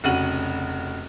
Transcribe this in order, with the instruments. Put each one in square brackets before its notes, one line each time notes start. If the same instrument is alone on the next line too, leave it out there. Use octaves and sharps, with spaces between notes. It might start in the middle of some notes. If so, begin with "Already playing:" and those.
[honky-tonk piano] F1 C#3 F#4 D#7 F#7